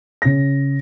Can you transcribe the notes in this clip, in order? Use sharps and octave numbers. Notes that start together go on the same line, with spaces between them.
C#3 A#6